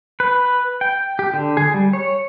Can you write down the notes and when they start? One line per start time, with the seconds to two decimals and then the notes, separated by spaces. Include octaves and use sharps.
0.20 B4
0.81 G5
1.19 G4
1.34 D3
1.57 G#4
1.74 G3
1.93 C#5